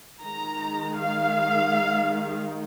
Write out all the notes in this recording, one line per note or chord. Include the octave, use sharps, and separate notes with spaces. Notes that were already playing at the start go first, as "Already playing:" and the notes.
D#3 G#3 D#4 A#5
F5